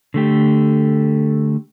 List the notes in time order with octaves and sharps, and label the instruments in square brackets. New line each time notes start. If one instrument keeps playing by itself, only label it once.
[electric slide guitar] D3 A3 G4